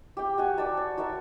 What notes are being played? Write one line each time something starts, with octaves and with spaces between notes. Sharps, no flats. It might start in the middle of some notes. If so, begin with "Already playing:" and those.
G4 G5
F#4 F#5 G#5
D5 F#5 A5 B5
C#5
F#4 A#4 C#5 E5